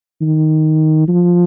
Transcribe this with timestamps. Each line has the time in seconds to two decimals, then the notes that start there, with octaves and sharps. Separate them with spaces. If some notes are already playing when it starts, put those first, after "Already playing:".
0.21 D#3
1.08 F3